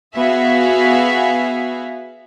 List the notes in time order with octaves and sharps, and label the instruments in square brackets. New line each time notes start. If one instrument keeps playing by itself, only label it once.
[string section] B3 F#4 G#4 E5 F5